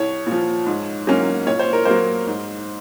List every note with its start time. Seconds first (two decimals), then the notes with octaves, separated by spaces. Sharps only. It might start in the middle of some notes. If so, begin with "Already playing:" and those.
Already playing: C2 C#5
0.27 A#2
0.32 F3
0.67 G#2
1.07 F#3 A#3 C#4
1.46 A#2 C#5
1.59 C5
1.73 A#4
1.85 F#3 A#3 C5
2.27 G#2